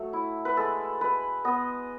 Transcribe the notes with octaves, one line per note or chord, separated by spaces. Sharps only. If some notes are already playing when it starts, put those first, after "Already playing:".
Already playing: F#3 A3
E4
B4
G#3 A4
G#3 B4
B3 D#5